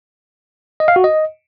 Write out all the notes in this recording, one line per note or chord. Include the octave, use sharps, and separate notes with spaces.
D#5
F5
F#4
D#5